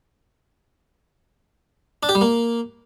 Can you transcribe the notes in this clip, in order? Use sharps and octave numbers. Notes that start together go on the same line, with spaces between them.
D4
G4
G3
A#3